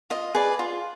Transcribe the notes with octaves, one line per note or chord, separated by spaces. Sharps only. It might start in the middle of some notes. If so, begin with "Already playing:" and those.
F4 D#5
G#4 B4 D5
F4